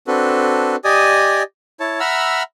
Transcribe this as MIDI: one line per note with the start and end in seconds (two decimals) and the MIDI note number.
0.07 0.76 60
0.07 0.76 62
0.07 0.76 66
0.07 0.76 69
0.07 0.76 71
0.84 1.43 67
0.84 1.43 74
0.84 1.43 75
0.84 1.43 80
0.84 1.43 87
1.80 2.00 64
1.80 2.00 73
1.80 2.00 81
2.00 2.43 76
2.00 2.43 78
2.00 2.43 82
2.00 2.43 83
2.00 2.43 88
2.00 2.43 89